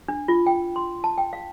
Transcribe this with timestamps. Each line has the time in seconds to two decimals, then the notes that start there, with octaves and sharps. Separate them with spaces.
0.08 D4
0.28 F4
0.46 G5
0.76 C6
1.04 A5
1.18 G5
1.33 F5